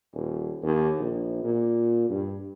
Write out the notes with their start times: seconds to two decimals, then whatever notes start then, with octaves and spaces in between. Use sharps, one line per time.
0.13 D#1
0.62 D#2
0.99 A#1
1.44 A#2
2.09 G2